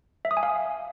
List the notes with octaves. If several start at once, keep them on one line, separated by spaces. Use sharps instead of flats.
E5
D#6
G#5
F5